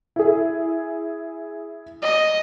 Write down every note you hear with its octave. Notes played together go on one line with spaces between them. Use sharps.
E4 G#4
D#5